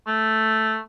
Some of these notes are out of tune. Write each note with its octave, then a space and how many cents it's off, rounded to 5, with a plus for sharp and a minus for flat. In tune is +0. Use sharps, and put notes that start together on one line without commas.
A3 +0